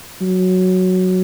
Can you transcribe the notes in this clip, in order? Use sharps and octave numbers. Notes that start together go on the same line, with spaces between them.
F#3